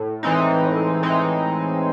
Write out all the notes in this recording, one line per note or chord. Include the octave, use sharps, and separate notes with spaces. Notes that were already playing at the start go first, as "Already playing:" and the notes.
Already playing: A2
E3 G#3 C4 D#4
A2
E3 G#3 C4 D#4